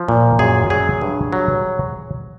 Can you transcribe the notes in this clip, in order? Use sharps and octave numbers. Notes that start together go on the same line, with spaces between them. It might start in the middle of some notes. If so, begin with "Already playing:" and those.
Already playing: F3
A#2
F#2 G#4
F#3 G#4
G2
F#3